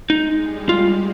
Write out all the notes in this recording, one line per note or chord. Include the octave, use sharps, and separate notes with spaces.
G#3 D#4
G3
F4